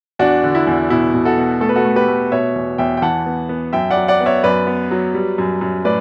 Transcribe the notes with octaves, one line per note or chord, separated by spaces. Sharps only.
E2 D4 F#4
D3
E4
E2
B2 E4
B2
F#4 A4
B2
A3 A4
B4
F#4 A4
A3
G4 B4
A3
B2 C#5 E5
E2
E2 E5 G5
G5
E3 F#5 A5
B3
B3
F#2 E5 G5
D5 F#5
F#3
D5 F#5
B3
C#5 E5
F#2 B4 D5
B3
F#3
G3
F#2
F#2
A2 B4 D5